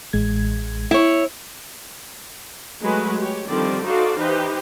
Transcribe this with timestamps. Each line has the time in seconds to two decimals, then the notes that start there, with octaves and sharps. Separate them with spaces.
0.13 A1 G#3 G#6
0.91 E4 C#5
2.80 F#3 G#3 A3 G#4 B4
3.18 G4 C#5
3.47 D3 D#3 F3 G3 C4 D5
3.84 D#4 F#4 A4 C5 D5 F5
4.18 E3 D#4 G4 B4 C5